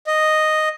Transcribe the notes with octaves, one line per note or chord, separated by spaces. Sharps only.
D#5